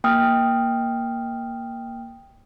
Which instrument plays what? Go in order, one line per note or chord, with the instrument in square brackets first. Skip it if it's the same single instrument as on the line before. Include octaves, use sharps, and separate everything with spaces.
[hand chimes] A#3 G5 D#6 F6